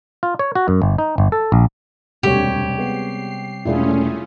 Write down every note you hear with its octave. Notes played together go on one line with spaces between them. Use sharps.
F4
C#5
F#4
F#2
G1
D#4
G1
A4
A#1
E1 D2 C3 G3 G4 C#5
G#3 B3 C7
E1 A3 C#4 E4 F4 G#4 D5